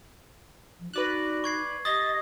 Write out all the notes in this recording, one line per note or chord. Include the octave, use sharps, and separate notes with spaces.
F3
D#4 F#4 B4 D5 F#6
C#6 G#6 C7
G4 D#5 D#6 A6